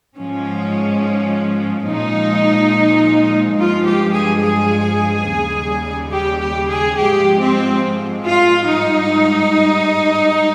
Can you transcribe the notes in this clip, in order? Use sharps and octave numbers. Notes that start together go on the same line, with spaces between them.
G#2 F3 G#3 C#4
A#2 F3 G#3 D#4
G2 F3 G#3 F4
G4
G#4
G#4
D#2 C#3 G3
G4
G4
G#4
G#2 F3 G#3 G4
C4
F4
G#2 G3 D#4